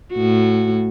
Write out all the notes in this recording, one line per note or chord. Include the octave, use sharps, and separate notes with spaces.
A2 F#4